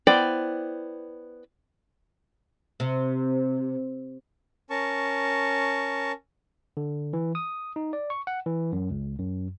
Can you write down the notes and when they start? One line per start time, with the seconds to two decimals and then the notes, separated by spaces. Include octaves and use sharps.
0.07 B3 E4 C5 D5 G5
2.80 C3
4.70 C#4 A#4 A5 C#6
6.77 D3
7.13 E3
7.35 D#6
7.76 D#4
7.93 D5
8.10 C#6
8.27 F#5
8.46 E3
8.72 F#2
8.90 C#2
9.19 F#2